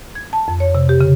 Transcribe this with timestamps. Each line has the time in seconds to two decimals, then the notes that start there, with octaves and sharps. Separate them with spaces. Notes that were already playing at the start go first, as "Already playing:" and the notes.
0.15 G#6
0.33 A5
0.48 F2
0.60 C#5
0.75 C3
0.89 G4
1.01 C#3